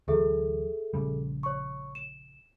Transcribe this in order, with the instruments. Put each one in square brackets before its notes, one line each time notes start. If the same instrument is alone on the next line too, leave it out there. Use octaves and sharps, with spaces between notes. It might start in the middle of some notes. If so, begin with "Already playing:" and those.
[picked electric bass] D2 E3 F#3 [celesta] G#4 A4 E5
[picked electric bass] A#1 C#3 G3
[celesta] C#5 C#6
E7